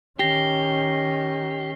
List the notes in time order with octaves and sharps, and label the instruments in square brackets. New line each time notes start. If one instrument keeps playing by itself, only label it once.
[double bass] D#3 C#4 [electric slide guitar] G4 [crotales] A#6 C7 G7